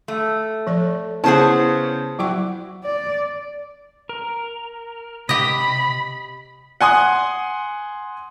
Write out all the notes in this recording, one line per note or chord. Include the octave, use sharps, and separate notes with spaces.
A3
F3 A4 D5
C#3 B3 E4 G#4 C5 F#5 A5
F#3 E4 F#4 G5 C#6
D5
A#4
C3 G4 D#5 B5
F#5 G#5 C6 D#6